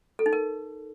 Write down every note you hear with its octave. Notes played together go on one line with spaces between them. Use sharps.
A4
D#4
A#4